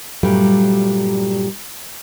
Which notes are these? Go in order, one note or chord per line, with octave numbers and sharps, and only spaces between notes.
G2 A#2 F#3 G3 A3